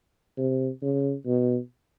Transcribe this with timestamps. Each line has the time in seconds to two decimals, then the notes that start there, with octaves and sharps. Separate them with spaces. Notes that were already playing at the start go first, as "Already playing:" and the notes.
0.38 C3
0.82 C#3
1.26 B2